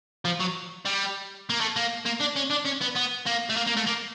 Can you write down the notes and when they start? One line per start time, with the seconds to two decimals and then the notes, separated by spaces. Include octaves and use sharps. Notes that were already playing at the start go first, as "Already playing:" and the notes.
0.25 F3
0.40 F#3
0.86 G3
1.50 A#3
1.61 A3
1.76 A#3
2.06 A#3
2.21 D4
2.36 C#4
2.51 D4
2.66 C#4
2.82 B3
2.96 B3
3.27 A#3
3.49 A3
3.56 A#3
3.67 A#3
3.76 A3
3.86 A#3